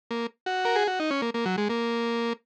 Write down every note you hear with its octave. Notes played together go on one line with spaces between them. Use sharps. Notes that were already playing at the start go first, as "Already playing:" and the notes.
A#3
F#4
A#4
G#4
F#4
D#4
C#4
A#3
A#3
F#3
G#3
A#3